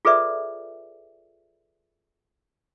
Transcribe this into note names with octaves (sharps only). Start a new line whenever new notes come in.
F4 G#4 A4 B4 D5 E5